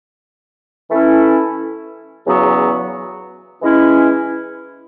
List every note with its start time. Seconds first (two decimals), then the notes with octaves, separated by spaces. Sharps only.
0.90 E3 A3 C#4 E4 A4
2.26 E2 C#3 F#3 B3 F#4
3.62 E3 G#3 C#4 E4